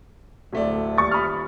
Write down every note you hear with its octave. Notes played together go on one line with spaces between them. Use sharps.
D1 A3 D5
D#1 C#6 A6
B5 D#6 F6